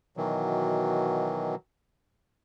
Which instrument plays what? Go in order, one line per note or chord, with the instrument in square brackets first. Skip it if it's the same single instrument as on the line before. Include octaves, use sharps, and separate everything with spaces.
[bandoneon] B2 D#3 E3 F#3